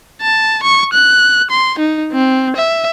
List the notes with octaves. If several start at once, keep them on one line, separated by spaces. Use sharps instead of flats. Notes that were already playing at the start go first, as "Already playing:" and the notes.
A5
C#6
F#6
C6
D#4
C4
E5